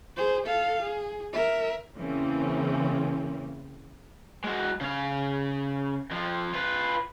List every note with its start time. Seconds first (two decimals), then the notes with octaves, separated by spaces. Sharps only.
0.17 G#4 C5
0.47 A4 F5
0.82 G#4
1.33 A#4 E5
1.97 E2 C#3 E3 A#3 C4 C#4
4.44 G#3 F#4
4.81 C#3 F5
6.11 F2 F3
6.54 F4 B4